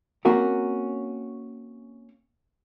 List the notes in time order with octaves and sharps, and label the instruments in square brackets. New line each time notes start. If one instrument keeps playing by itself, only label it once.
[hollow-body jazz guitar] A#3 C4 C#4 F#4 A#4 C5